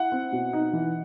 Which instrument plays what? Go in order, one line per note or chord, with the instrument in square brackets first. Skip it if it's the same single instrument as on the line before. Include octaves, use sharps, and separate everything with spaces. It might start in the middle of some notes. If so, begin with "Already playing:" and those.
Already playing: [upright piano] E4 F#5
C4
B2
D#4
E3